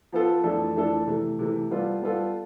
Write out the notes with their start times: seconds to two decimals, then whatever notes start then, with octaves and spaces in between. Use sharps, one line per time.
0.12 F3 B3 F4 A4
0.44 F2 E3 A3 D4 A4
0.76 F2 E3 A3 D4 A4
1.07 C3 E3 A3
1.39 C3 E3 A3
1.71 G3 B3 F4 A4
2.02 G3 B3 F4 A4